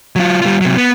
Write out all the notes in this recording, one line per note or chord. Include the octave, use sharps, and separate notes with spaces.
F#3 F4
G3 F4
C3 F#3
B3